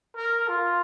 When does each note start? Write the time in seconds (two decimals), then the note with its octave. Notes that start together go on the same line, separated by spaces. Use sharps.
0.16 A#4
0.48 F4